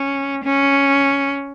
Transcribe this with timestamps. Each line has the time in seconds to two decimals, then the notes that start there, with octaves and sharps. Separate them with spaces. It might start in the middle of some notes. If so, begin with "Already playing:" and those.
Already playing: C#4
0.44 C#4